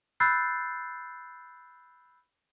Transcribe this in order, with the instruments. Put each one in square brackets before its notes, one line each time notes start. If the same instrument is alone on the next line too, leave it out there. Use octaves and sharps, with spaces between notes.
[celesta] B5 E6 F#6 G6 A6 C7